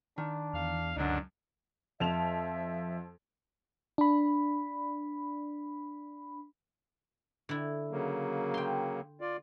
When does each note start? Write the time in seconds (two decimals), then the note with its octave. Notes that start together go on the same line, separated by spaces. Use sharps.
0.18 D#3 D4
0.54 E2 F5
0.96 C#2 F#2 D3 D4 D#4
2.00 F2 F3 E5 A5 F7
3.98 D4 B5
7.49 D3 E4
7.91 C#3 F#3 A#3
8.54 G5 C6
9.21 F4 D5